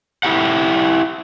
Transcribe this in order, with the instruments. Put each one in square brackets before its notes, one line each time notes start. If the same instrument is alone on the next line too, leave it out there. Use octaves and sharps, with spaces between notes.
[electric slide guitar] E4 G4 F#5